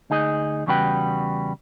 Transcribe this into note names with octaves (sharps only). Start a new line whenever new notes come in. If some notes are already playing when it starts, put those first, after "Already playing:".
D2 D#4 G#4 D#5
E2 C#3 G3 F#4 B4 G5